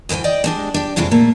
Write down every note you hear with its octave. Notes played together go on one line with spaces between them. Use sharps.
D2 E3 B4 G5 G#5
D5 D#5 G5
G#3 D4 G4
D4 G4
F2 A2 C3 D4 F4 G#4
A#2 A3 A#3